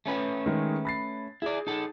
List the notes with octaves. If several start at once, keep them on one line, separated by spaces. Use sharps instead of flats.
A3 C#4 B4
D#3 G#3 G#4
B5 A6 C7
E4 G#4 D5
D#4 A4